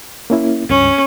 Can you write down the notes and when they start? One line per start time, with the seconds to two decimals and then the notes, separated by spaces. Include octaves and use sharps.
0.30 A#3 C#4 E4
0.70 C#2 G2 C#4